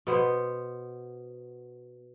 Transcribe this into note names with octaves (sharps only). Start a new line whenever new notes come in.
B2 B3 C5